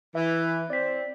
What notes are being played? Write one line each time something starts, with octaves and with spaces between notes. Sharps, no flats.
E3 E5
C4 D5 B6